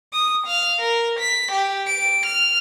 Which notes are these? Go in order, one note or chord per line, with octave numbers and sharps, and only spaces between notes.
D#6
F5
A#4
B6
G4
D7
F6